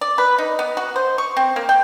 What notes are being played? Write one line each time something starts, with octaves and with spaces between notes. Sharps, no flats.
D5
B4
D#4
B3
F#4
C5
C#6
C4
A#3
G5